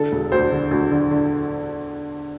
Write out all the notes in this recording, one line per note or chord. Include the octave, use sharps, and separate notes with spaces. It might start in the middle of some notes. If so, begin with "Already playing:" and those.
Already playing: D3 A4
E1
D2 C5
D3
D2
D3
D3